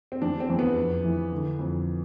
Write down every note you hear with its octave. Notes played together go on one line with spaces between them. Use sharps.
C4
E2 D4
C4
E2
B3
F2
E3
D3
F2